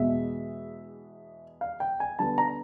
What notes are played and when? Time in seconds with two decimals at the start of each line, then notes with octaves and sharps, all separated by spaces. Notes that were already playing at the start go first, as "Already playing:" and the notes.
Already playing: E2 B2 G#3 E5
1.61 F5
1.80 G5
2.00 G#5
2.19 D3 G3 B3 A5
2.38 A#5